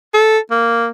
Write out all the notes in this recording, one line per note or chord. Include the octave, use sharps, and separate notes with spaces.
A4
A#3